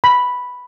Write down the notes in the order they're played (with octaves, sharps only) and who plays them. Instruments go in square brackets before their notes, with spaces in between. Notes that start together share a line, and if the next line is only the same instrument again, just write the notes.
[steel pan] B5